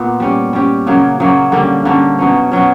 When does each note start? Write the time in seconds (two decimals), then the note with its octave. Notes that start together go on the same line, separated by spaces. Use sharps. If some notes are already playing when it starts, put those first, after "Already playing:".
Already playing: A#2 B3
0.20 G3 C#4 G4
0.53 G3 C#4 G4
0.87 C#3 F#3 A#3
1.20 C#3 F#3 A#3
1.52 D3 G3 A#3 C#4
1.85 D3 G3 A#3 C#4
2.19 B2 F#3 C#4
2.52 B2 F#3 C#4